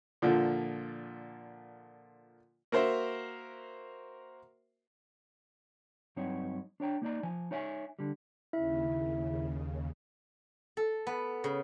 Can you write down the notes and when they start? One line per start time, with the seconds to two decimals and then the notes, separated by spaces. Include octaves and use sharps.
0.22 A#2 D3 F3
2.72 A#3 F#4 A#4 C5 E5
6.16 G2 F#3 C4 D#4 C#5
6.80 D4 C#5 G5 A#5
7.02 A#3 D#4 D5 A#5
7.23 F3 G#5
7.51 D#4 C#5 E5 G#5
7.99 D3 G3
8.53 D#2 C#3 E4 E5
10.77 A4
11.07 B3
11.44 C#3